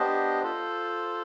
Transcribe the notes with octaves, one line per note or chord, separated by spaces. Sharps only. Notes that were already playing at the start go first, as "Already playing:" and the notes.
Already playing: B3 D4 G4 C5 D#5
F4 A4 C5